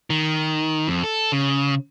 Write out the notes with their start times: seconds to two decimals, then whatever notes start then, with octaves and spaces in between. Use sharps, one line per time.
0.10 D#3
0.88 F2
1.03 A4
1.32 C#3